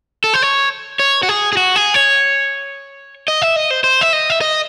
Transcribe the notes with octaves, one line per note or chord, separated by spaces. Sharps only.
A4
C5
C#5
C#5
F#4
G#4
G#4
F#4
G#4
C#5
D#5
E5
D#5
C5
C5
E5
D#5
E5
D#5